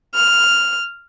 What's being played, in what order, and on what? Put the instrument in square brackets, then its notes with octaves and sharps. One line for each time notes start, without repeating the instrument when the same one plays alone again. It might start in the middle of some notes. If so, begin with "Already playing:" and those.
[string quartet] F6